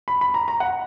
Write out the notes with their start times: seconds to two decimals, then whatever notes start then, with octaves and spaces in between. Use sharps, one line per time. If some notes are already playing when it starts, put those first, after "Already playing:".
0.08 B5
0.21 B5
0.34 A#5
0.48 A#5
0.60 F#5